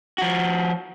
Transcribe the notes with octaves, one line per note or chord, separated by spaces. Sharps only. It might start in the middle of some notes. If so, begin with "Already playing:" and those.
F3 F#4